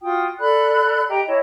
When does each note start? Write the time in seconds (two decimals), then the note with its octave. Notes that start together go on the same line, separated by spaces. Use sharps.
0.02 F4 F#4 G5 D#6
0.40 A4 D5 B5 F#6
1.09 G4 D#5 G5 A#5
1.27 E4 C#5 D#5 A5